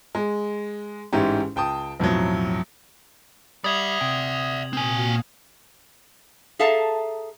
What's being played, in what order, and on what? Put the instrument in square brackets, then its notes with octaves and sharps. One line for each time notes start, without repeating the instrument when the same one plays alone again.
[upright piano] G#3
A1 G#2 G#3 C#4 E4 G4
C#2 G5 A5 D#6
B1 F2 A2 F#3
[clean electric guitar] G3 [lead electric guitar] D5 E5 [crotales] D#6 G#6 F#7
[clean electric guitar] C3 G5
[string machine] A#2 F#4 F5 [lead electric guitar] C4 G#5
[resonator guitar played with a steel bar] G#4 A4 E5 F5 A5 A#5